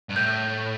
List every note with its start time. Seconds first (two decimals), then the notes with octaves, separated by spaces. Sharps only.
0.09 G2
0.16 A2 G6